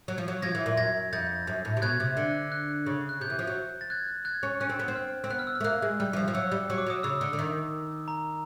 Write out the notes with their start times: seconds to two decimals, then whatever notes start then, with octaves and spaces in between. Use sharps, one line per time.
0.08 F#3
0.18 F3
0.28 F#3
0.42 F3 G#6 A#6
0.55 E3
0.66 A#2
0.77 F#2 G#6 A#6
1.13 F2 G6 A6
1.47 F#2
1.65 A2
1.77 C3
1.82 B2 F#6 G#6
2.00 C3
2.17 D3
2.52 F#6
2.86 C#3
3.09 F#6
3.21 C3 G6
3.30 E3
3.39 F3
3.47 F#3
3.81 A6
3.90 F#6 G#6
4.25 F#6 G#6
4.43 C#4
4.60 C#4 F#6
4.70 C4
4.79 B3
4.88 C4
4.96 F6
5.24 C4
5.30 B3 F#6
5.39 F6
5.47 E6
5.55 F6
5.60 A3
5.64 A#3 F#6
5.82 G#3
6.00 G3 F6
6.13 E3
6.16 F3
6.28 F3
6.34 F#3 E6
6.52 G3
6.70 F#3
6.78 D6
6.86 F#3 D#6
7.03 C#3 E6
7.21 D3
7.33 D3
7.39 D#3
8.08 A#5